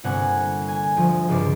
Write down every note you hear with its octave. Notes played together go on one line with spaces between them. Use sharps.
G1 C3 F#5 G#5
A#3
G#5
D2 F3
C#2 G2 C3 D5